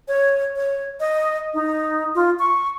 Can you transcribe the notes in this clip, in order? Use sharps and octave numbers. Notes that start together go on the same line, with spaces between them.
C#5
C#5
D#5
D#4
F4
C#6